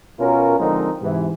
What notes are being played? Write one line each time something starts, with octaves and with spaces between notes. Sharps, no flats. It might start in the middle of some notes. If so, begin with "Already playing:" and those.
B2 C#4 F4 F#4 A#4
D3 F3 G#3 C4 D#4 A#4
G#2 C3 E3